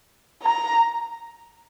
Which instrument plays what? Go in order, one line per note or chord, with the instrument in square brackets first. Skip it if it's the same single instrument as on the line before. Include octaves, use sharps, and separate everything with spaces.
[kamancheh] A#5